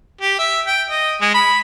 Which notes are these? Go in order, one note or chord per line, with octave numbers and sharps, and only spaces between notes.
G4
E5
G5
D#5
G#3
B5